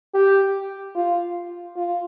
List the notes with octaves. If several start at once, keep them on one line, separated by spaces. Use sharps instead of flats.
G4
F4
F4